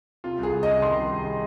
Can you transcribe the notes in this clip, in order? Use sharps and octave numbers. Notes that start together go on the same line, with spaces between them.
C3 F4
C2 G#4
C2
C2 D#5
D#3 C6
D#3
C2